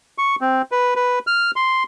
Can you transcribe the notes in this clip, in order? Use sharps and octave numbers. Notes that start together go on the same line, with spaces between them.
C#6
C4
B4
B4
F6
C6